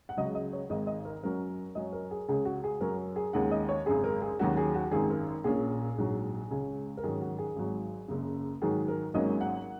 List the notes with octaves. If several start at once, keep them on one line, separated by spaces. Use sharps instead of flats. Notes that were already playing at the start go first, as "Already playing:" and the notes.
F#5
C#2 C#3 F#3 D#5
D#5
C#5
G#1 G#2 D#3 D#5
D#5
A#4
F#2 F#3 C#4 A#4
F#2 F#3 C#4 D#5
A#4
G#4
C#2 C#3 G#3 C#4 G#4
F#4
G#4
F#2 F#3 C#4 A#4
G#4
D#2 D#3 G#3 C#4 F#5
D#5
C#5
G#1 F#2 C#3 G#3 G#4
A#4
G#4
D#2 D#3 F#3 C#4 F#4
G#4
F#4
G#1 F#2 D#3 G#4
A#4
A#1 A#2 A#3 C#4 G#4
A#1 G#2 F#3
C#2 C#3 G#3 C#4
A#4
G#2 D#3 F#3 C#4 G#4
F#4
G#4
G#1 G#2 F#3
F#1 F#2 C#3
G#2 D#3 F#3 G#4
A#4
G#1 G#2 F#3 A#3 C#4 D#5
F#5